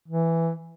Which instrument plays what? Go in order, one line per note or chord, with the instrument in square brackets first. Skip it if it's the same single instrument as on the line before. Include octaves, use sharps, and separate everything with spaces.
[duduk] E3